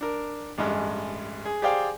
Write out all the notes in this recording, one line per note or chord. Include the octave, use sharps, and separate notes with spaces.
D4 A#4
A1 G2 G#3
G#4
G4 G#4 C5 D5 F5 G5